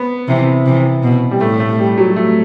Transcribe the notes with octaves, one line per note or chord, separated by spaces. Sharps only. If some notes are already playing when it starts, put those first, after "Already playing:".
Already playing: B3
C3 E3
C3 E3
B2
G3
A2 A3
A3
G3
F#3
A3